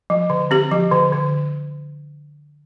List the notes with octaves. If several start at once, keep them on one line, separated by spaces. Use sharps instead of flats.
F3
D3
C4 G4
F3
D3
D3